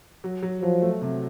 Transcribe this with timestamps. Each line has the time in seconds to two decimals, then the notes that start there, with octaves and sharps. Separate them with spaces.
0.24 F#3
0.42 F#3
0.62 F3 F#3
0.82 A3
1.02 C3